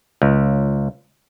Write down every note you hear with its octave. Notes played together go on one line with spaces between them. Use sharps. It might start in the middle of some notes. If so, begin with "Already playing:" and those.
C#2